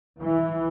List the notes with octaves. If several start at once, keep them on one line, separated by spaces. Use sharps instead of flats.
E3